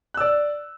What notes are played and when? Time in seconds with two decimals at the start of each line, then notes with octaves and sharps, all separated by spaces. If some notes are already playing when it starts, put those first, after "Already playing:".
0.14 F#6
0.17 E6
0.20 D5